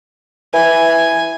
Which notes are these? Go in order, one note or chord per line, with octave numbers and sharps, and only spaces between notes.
E3 G#5